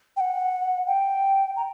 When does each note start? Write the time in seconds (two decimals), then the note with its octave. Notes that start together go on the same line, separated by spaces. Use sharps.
0.16 G5
0.20 F#5
0.87 G5
1.56 A#5